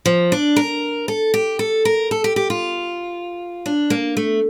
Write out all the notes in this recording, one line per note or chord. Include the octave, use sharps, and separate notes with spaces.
F3
D4
A#4
A4
G4
A4
A#4
A4
G4
G4
F4
D4
A#3
A3